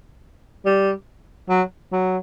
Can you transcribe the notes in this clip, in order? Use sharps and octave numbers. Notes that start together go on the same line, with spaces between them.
G3
F#3
F#3